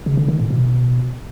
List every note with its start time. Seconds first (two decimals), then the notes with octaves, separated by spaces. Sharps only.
0.06 C#3
0.17 D3
0.28 D#3
0.39 A2
0.51 B2